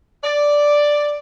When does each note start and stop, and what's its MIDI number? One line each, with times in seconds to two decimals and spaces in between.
0.24 1.18 74